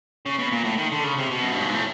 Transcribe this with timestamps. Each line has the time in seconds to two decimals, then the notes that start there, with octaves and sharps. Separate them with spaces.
0.26 C#3
0.39 B2
0.52 A#2
0.65 A2
0.78 D#3
0.92 D3
1.04 C#3
1.18 C3
1.31 B2
1.42 F#2
1.52 G2
1.62 G#2
1.74 A2